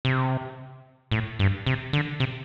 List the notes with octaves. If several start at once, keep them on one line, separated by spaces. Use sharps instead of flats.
C3
A2
G2
C3
D3
C3